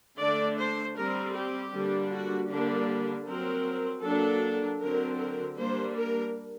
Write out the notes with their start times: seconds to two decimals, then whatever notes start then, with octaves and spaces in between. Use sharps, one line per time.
0.19 D3 A3 D4 D5
0.58 C5
0.96 G3 C4 A#4
1.34 G4
1.73 D3 G3 A#3 D4
2.11 F#4
2.49 D3 G3 A#3 D4 G4
3.26 F#3 C4 A#4
4.02 F#3 A#3 D4 A4
4.79 D3 F#3 C4 A#4
5.18 A#4
5.56 G3 A#3 D4 C5
5.95 A#4